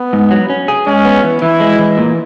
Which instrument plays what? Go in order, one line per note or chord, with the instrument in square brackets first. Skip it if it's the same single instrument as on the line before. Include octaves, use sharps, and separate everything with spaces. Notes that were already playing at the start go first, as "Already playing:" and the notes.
Already playing: [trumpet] B3
[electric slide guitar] G#2
F#3
C#4
G#4
[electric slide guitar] G#3 [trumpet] C#4
[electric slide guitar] B3
E3
[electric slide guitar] E3 [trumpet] E4
[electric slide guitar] G#3
E3
A#2